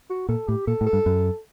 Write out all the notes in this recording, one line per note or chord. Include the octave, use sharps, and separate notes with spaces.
F#4
A#2 A4
A2 G4
A#2 A4
A2
A4
G2
F#2